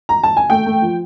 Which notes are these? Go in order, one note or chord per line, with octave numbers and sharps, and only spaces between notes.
A#5
A5
G#5
A3 G5
A3
F3